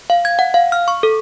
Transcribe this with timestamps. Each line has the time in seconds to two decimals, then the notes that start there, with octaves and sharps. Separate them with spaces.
0.10 F5
0.25 G#6
0.39 F#5
0.54 F5
0.72 F6
0.88 C#6
1.03 A4